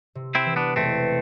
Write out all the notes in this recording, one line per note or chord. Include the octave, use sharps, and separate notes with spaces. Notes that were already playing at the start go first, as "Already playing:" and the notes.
C3
C4 E4
E3
B3 D4
E1 A3 C4